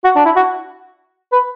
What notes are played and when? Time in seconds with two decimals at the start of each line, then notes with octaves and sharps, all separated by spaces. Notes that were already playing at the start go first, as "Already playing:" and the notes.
0.04 F#4
0.15 D4
0.25 E4
0.36 F#4
1.32 B4